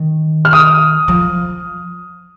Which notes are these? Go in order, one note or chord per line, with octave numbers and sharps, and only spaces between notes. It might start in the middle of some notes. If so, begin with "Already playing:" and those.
Already playing: D#3
F6
D#6
F3